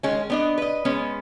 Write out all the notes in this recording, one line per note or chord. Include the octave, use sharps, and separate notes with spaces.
D#3 G#3 C#4
B3 D4 D#5
B4 D#5
G#3 B3 C#4